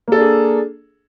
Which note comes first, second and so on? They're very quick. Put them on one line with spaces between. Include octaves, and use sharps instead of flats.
A#3 A4 D4 G#4